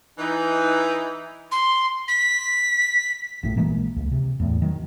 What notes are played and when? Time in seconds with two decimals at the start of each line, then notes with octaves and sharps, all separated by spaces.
0.19 E3 D#4
1.52 C6
2.08 B6
3.43 A#1 A2
3.57 A#1 E3 G#3 A#3
3.96 C#2
4.12 C3
4.40 E2 A2
4.62 D#3 F#3